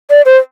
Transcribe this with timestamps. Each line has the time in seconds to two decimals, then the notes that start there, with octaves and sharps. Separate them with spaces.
0.10 D5
0.26 C5